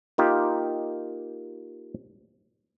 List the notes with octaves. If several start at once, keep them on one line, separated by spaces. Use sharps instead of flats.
A#3 D#4 F4 G4